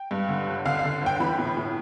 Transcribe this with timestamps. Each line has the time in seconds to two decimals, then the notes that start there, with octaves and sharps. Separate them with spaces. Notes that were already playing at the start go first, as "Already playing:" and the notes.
Already playing: G5
0.11 G2
0.28 D3
0.47 G1
0.65 D3 F5
0.79 F5
0.84 D3
1.02 G1 G5
1.20 E3 B5
1.39 A2
1.57 A2